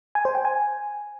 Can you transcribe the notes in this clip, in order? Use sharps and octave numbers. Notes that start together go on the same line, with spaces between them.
G#5
C5
G5
G#5